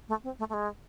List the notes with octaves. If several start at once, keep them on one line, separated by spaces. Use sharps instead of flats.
A3
C4
A3
A3
G#3